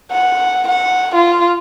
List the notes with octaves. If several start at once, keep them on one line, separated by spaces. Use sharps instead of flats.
F#5
F#5
F4